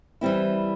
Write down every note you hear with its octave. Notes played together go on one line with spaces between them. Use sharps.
E3 G3 C4 E4